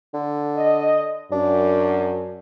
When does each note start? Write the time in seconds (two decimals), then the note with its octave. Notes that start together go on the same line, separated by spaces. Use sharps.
0.14 D3
0.56 D#5
1.32 F#2 D4